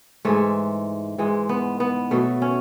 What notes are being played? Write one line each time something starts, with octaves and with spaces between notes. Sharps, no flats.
G#2 E3 G#3 A3
G#2 E3 G#3
B3
B3
B2 F#3 A3
C#4